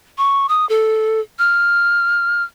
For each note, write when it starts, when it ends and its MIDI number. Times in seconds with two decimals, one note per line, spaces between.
0.18 0.46 85
0.49 0.68 87
0.69 1.20 69
1.39 2.43 89